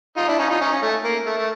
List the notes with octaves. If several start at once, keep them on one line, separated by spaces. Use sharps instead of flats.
D#4 F4
D4 E4
C#4 D#4
D#4 F4
C#4 D#4
C#4
A3
A#3
A3
A3